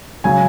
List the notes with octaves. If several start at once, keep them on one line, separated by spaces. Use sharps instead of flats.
C#3 F#3 G#5